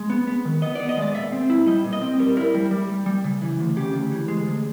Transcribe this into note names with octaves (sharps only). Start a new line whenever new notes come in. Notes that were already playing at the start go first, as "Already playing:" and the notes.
Already playing: G#3
B3
B3
D#3
B3 D#5
B3 D5
D#5
G#3 D5
A#2 E5
C4
E4
G3 D#5
A#2
D#5
C4
G3 A#4
E4 A#4
G3
G3
G3
G3
C#3
E3
D2
C#3 G4
D2
E3
G#3
D2